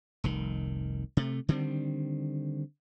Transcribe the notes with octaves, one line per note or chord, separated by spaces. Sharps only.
F1 C2 D#3
C3 A3
D3 D#3 G3 C4